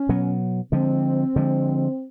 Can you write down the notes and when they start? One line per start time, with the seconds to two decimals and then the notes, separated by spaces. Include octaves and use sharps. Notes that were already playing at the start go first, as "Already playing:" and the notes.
Already playing: C#4
0.09 B2 F#3 B3
0.72 D3 F3 G#3 C4
1.36 D3 F3 G#3